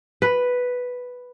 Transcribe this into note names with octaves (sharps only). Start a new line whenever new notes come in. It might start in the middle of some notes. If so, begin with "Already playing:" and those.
B4